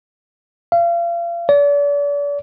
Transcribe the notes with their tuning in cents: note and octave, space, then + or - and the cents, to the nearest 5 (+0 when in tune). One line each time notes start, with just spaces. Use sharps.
F5 -35
D5 -40